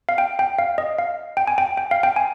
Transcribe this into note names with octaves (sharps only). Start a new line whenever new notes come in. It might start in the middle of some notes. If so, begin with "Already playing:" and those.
F5
G5
G5
F5
D#5
F5
G5
G#5
G5
G5
F5
G5
G#5